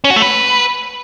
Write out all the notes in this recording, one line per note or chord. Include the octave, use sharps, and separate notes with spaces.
C#4
F#4
A3
B4